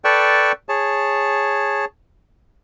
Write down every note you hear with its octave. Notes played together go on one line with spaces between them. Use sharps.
A4 B4 D5 G5 A5 C#6
G#4 C#5 A5